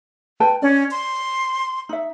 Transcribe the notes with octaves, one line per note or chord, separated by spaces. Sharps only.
B4 G5 A5
C#4 D5
C6
D#4 E5